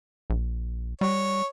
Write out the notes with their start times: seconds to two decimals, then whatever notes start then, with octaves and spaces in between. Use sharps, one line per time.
0.30 A#1
1.01 G3 C#5